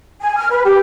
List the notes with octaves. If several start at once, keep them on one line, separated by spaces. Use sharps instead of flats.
G#5
F6
B4
G4